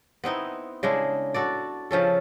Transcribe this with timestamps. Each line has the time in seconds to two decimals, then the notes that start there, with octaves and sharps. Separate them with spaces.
0.24 B3 C4 D#4 E4
0.83 C#3 G#3 D4 E4
1.34 F#4 A4 D5
1.91 C#3 F3 C#4 A4